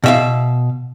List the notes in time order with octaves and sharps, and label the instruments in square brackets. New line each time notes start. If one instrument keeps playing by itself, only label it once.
[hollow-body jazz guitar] B2 E5 F5